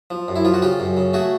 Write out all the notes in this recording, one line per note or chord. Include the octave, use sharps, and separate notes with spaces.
F3
F#2
E4
F3 F4
F#4
C#3 F4 G4
F#2
C#3
A3 F#4 G#4